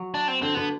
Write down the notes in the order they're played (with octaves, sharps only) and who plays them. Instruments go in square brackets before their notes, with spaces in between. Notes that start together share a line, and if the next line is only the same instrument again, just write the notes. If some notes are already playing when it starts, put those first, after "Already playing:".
Already playing: [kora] F#3
[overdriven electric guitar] D4
C4
[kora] D3 [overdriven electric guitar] C4
[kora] D3 [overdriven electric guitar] B3